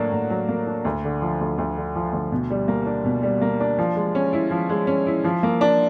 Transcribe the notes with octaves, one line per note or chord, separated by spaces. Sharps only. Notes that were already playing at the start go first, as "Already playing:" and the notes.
Already playing: A2 F#3 A#3 D4
A2
F#3
A#3
D4
D2
D3
F3
D2
D2
D3
F3
D2
B2
G3
A#3
D4
B2
G3
A#3
D4
F3
G#3
C#4
E4
F3
G#3
C#4
E4
F3
A#3
D4